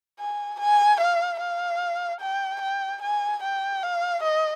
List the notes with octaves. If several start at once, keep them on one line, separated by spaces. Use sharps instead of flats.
G#5
G#5
F5
F5
G5
G5
G#5
G5
F5
D#5